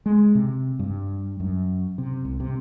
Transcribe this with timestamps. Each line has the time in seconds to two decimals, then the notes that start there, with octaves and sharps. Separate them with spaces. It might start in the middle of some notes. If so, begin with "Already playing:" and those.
0.06 G#3
0.35 C3
0.79 G2
1.40 F#2
1.98 C3
2.25 C2
2.40 C3